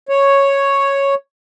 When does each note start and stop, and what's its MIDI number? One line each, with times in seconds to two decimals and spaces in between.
0.09 1.14 73